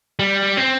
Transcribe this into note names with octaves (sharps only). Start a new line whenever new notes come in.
G3
C4